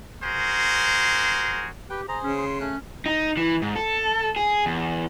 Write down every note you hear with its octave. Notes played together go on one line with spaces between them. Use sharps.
F#4 G#4 A#4 C5
G4 B4 G5
G#4 C5 A#5
C#3 C#4
C6
A3 C#4 F#6
D#4
E3
G#2
A4
G#4
E2